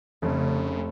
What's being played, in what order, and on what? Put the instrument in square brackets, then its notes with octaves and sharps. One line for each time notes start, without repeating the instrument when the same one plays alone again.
[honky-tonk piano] F1 [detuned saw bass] C#3 [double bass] A3